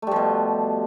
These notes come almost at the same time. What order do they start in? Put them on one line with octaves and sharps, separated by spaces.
A3 G3 F3 B2